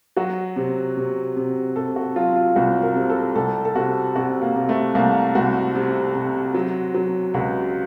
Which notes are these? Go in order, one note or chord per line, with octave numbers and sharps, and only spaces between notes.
F#3 F#4
C3
C3
C3
C3 A4
F#4
F#3 F4
F4
C2 F#4
A#4
C3
A4
C2 A4
A4
C3 F#4
C3 F#4
A#3
C3
A3
C2 A#3
C2 F#4
C3
C3
F#3
F#3
C#2 F#4